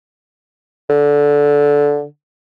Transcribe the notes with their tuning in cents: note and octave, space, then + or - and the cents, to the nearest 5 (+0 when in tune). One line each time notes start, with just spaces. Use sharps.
D3 -15